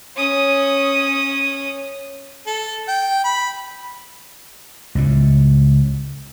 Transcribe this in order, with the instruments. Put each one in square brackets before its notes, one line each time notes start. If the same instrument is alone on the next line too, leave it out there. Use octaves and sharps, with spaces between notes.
[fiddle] C#4 D#6
[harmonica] A4
G5
B5
[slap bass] C#2 A2